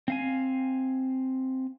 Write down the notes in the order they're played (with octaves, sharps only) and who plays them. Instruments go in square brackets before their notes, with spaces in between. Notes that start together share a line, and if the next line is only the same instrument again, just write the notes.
[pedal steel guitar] C4 F5 G#5